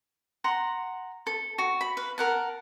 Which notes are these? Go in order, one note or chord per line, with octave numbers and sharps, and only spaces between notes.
F#5 A#5 C6
A4
F#4
B5
B4 F5
A#4 F#5 A5